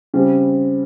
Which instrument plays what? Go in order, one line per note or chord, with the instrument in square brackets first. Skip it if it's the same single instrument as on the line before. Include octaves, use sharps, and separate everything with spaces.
[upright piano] C#3 G3 C4